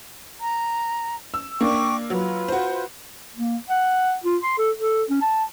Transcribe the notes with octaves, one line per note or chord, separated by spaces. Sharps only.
A#5
E6
A#3 D4 G5 C#6 D6
F#3 F4 B4
F#4 C5
A#3
F#5
F4
C6
A4
A4
C#4
A5